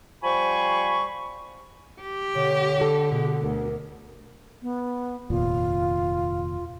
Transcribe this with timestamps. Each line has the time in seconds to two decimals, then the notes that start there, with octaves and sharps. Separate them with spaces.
0.23 F3 G3 C5 G#5 B5 C#6
2.02 G4
2.35 B2 D3 C#5
2.78 D4 A4
3.12 B2 G#4
3.42 D2 A#4
4.62 B3
5.30 F1 D#2 A#2 F4